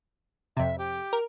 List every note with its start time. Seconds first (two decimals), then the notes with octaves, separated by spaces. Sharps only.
0.57 F2 C3 E5
0.78 G4
1.13 A#4